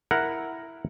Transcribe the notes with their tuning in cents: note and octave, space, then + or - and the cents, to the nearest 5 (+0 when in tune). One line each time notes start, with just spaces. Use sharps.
E4 +0 A#4 +0 F#5 +0